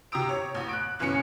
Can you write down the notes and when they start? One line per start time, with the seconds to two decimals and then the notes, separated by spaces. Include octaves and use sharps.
0.12 C3 G5 A#5 D#6 E6 D7
0.29 C#5
0.55 A1
0.69 F#6 D7
0.99 F#1 B1 E3 C#4 C#7